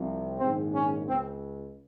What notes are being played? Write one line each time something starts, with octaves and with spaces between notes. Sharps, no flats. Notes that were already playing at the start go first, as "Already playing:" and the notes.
Already playing: C2 C3 F3
A#1 G#2 D#3 C4
C#4
C#2 C4